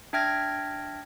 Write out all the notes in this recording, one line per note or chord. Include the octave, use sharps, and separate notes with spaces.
D4 E5 G5 F6 G#6 A#6